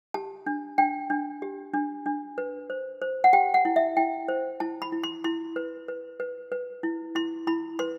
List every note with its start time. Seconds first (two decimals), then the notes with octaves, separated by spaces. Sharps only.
0.14 G4 A5
0.46 D4
0.78 D4 G5
1.10 D4
1.42 G4
1.74 D4
2.06 D4
2.38 B4
2.70 C5
3.02 C5
3.24 F#5
3.33 G4 G5
3.54 F#5
3.65 E4
3.76 E5
3.97 E4 G5
4.28 C5
4.60 E4 A5
4.82 B5
4.92 E4
5.04 C6
5.24 E4 C6
5.56 B4
5.88 B4
6.20 B4
6.52 B4
6.83 E4
7.15 E4 C6
7.47 E4 B5
7.79 B4 C6